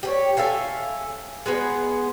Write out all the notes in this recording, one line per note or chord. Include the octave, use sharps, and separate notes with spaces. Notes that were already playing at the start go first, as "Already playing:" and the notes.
G4 G#4 C#5
A4 E5 F5 G#5
G#3 B3 G#4